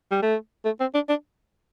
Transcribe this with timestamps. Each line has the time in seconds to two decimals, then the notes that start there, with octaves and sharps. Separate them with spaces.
0.11 G3
0.22 A3
0.65 A3
0.80 C4
0.94 D4
1.09 D4